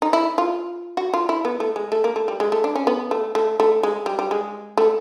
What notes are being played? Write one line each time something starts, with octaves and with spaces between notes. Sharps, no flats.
D#4
E4
F4
F#4
F4
E4
B3
A3
G#3
A3
A#3
A3
G3
G#3
A3
D4
C#4
B3
A3
A3
A3
G#3
G3
G3
G#3
A3